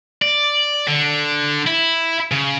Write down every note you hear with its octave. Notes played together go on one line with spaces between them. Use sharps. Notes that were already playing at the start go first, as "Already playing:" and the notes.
D5
D3
E4
C#3